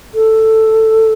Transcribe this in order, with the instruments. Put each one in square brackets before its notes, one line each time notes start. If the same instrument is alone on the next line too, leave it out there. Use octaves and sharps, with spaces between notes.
[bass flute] A4